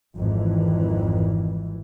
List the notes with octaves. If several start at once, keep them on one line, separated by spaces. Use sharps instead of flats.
G#1 F2 E3